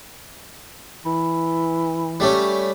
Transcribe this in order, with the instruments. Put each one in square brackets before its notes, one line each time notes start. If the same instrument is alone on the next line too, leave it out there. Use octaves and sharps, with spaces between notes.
[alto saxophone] E3
[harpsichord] G3 A3 C#4